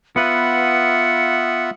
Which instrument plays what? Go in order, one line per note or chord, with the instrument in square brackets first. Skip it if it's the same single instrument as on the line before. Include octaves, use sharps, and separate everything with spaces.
[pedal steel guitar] B3 B4 [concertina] F4 E5 F#5 [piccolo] C#7